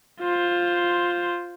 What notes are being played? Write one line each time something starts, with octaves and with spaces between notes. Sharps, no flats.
F4 C5